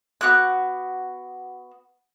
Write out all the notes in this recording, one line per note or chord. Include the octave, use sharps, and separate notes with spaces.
B3 F#4 D6 F#6